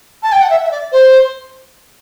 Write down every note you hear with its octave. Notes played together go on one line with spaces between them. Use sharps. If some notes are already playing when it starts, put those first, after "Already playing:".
A5
G5
F#5
E5
E5
D5
C5